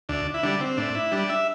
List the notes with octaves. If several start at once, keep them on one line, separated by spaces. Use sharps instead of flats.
D2 D4
E4
D3 G3 D4
C4
A2 D4
E4
G3 D4
E5